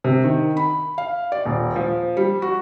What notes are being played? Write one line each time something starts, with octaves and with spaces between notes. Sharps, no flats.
C3
D#3
B5
F5
D5
D#1
F3
G3
F#4